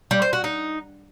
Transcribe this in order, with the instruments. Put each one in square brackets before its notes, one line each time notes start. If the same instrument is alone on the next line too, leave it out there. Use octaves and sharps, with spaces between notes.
[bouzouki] G3
C5
F#4
D#4